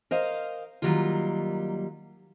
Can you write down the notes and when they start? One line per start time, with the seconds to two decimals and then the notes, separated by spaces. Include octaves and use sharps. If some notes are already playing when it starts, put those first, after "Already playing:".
0.11 A#4 C5 D#5 F5
0.82 D#3 F#3 G3 A#3 F4